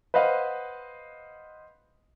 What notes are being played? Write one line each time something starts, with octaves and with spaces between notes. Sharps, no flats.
B4 C5 D#5 F5 F#5